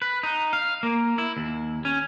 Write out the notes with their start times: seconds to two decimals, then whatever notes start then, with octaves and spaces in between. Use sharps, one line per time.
0.02 B4
0.23 D#4
0.53 F5
0.83 A#3
1.18 E4
1.37 D#2
1.85 C#4